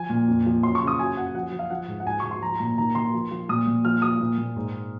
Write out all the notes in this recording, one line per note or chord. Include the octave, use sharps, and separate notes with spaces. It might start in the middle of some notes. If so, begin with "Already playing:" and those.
Already playing: F3 G#5
A#2
F2
F3
F#2 C6
C#6
C#3
D#6
F#2 G#5
F#2 F#5
F3 F#5
F3
F5
F3 F#5
G#2
F#5
G#2 G#5
G#2 C#6
C6
F3 A#5
A#2 A#5
D#3 A#5
D#3 C6
F3
F3
A#2 D#6
A#2
F3 F6
F3 D#6
A#2
A#2
G#2